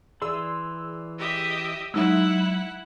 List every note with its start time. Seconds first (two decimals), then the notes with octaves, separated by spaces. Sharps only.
0.22 E3 G#4 D5 C6 E6
1.18 G4 D#5 E5
1.94 F#3 G#3 D#4 E4 E5 F#5 E6